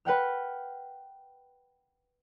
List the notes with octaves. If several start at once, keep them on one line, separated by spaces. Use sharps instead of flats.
B4 F#5 G5 F6